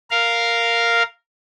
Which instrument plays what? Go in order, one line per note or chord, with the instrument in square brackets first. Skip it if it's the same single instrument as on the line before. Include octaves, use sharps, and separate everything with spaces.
[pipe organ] A#4 F5